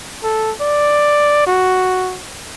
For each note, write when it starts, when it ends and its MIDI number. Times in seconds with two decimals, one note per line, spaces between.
0.24 0.53 69
0.61 1.46 74
1.47 2.17 66